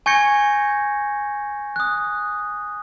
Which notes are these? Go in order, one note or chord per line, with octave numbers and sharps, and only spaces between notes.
G#5 C#6 G6 G#6 A#6 C#7
D#6 F#6